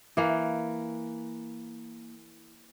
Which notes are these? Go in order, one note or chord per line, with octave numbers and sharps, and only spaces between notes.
E3 A#3